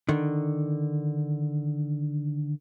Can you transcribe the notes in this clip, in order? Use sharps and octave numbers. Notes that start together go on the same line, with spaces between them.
D3 D#3